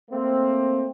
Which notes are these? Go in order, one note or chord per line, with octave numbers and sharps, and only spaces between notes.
A3 A#3 C4